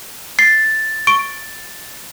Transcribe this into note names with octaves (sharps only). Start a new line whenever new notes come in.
A6 C7
C#6 D7